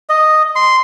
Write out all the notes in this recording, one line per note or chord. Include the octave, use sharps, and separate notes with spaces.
D#5
C6